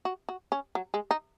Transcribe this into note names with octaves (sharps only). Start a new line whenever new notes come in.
F#4
F#4
C#4
F#3
G#3
D#4